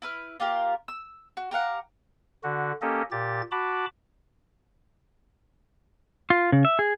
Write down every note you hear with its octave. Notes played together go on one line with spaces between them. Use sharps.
E4 B4 F6
A#3 F4 G4 A#4
E6
F#4
G4 A#4 F5 F#5
D3 F#4
A#3 C#4 G4 A4 D#5
A#2 G4 A6
F#4 A5 B5 D6
F4
C#3
E5
G#4